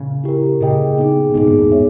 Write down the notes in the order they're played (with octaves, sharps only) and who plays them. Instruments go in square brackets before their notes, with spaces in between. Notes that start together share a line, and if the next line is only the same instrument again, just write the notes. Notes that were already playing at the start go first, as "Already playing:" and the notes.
Already playing: [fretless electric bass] A#2 C#3
[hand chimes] E4 G4 A#4
[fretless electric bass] A#2 C#3 [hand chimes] G#4 D#5 G5
[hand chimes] B3 D#4 G#4
[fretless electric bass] C#3
[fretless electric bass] G#2 B2 [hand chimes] B3 D#4 G#4
[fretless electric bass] G2 A#2
E2 G#2
[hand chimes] C#5 E5